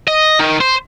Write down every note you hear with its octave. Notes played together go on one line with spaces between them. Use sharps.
D#5
D#3
C5